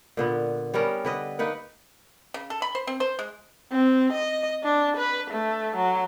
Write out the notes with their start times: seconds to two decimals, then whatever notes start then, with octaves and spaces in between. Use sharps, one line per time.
0.17 A#2 D3 B3
0.74 G3 B3 C#4 A#4
1.05 D3 B4 D#5
1.39 A#3 D#4 B4 F#5
2.34 C#3
2.50 A4
2.62 B5
2.75 C5
2.87 C4
3.00 C5
3.19 G#3
3.72 C4
4.13 D#5
4.64 D4
4.97 B4
5.31 A3
5.76 F#3